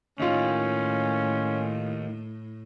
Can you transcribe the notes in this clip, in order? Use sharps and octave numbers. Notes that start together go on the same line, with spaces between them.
D#2 A2 C#4 D#4 F4